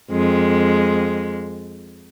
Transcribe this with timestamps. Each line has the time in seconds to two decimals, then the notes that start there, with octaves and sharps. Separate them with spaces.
0.11 F2 G#3